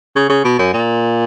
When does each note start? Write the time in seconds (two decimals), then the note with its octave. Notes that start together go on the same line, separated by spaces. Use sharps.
0.16 C#3
0.30 C#3
0.45 B2
0.59 F#2
0.74 A#2